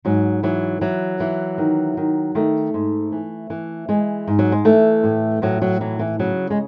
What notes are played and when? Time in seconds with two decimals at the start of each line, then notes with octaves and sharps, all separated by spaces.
0.05 G#2 F#3
0.43 E3 F#3
0.81 E3 F#3
1.20 E3
1.58 D#3
1.97 D#3
2.35 D#3 A3
2.74 G#2
3.12 E3
3.50 E3
3.88 E3 G#3
4.27 G#2
4.39 F#3
4.52 G#3
4.65 E3 A3
5.03 A2
5.42 A2 F#3
5.62 F#3
5.80 E3 F#3
5.99 E3
6.19 C#3 F#3
6.50 G#3